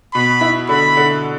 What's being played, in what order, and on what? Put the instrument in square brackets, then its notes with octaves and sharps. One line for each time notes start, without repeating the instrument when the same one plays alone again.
[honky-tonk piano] B2 [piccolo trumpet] B5
[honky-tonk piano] E4
[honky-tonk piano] D3 [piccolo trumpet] B5
[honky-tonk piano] D3